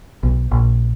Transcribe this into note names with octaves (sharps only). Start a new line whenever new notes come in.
B1
A#1